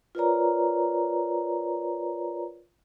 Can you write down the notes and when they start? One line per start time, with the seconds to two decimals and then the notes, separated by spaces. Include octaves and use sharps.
0.15 F4 A#4 B4 C#5 D5 A#5